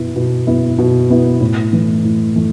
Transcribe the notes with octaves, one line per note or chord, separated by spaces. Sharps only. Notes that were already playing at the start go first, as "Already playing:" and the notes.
Already playing: B2 B3 E4
B2
B3 E4
B2
B3 E4
A2
E3 A3
A2
E3 A3